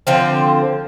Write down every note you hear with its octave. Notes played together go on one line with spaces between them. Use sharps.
D3 F3 C4